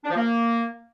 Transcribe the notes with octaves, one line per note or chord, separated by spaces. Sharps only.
D4
F3
A#3